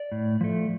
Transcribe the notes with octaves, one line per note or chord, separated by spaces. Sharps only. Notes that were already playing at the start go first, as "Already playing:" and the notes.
Already playing: D5
A2
F3 A3